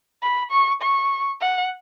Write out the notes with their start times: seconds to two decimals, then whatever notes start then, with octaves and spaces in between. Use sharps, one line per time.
0.22 B5
0.51 C#6
0.82 C#6
1.41 F#5